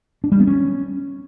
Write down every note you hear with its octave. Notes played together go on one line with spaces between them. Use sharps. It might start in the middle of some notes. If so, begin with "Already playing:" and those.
D4
G3
B3
C#4